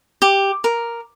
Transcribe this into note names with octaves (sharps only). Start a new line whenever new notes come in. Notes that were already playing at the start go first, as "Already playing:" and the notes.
G4
A#4